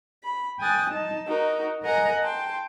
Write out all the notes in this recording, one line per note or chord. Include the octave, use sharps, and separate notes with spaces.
B5
G5 G#5 D#6 F#6 A6
D#4 A5
D#4 F#4 A#4
A#4 D#5 F#5 G#5 A#5
G5 A5 C6